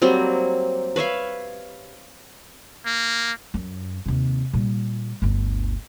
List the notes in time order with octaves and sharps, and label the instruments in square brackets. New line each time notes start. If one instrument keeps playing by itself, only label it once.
[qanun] F#3 G3 A#3 C4
B4 C#5 E5 F5
[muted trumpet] A#3
[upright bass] F#2
D#2 C3
A#2 G3
G1 D2